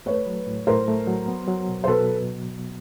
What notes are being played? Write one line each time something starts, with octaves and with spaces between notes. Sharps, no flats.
A3 B4 C#5
F#3
A2
A2 A#4 C5
A3
F#3
B3
F#3
B2
C5
B2 A4 B4